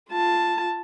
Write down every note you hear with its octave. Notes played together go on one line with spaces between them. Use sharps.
F4 A5